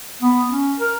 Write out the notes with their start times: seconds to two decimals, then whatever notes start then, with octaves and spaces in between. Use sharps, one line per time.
0.22 B3
0.49 C#4
0.79 A#4